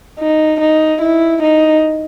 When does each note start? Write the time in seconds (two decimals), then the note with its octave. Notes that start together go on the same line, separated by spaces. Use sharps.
0.19 D#4
0.60 D#4
1.02 E4
1.42 D#4